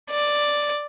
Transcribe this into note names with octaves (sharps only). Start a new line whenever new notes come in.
D5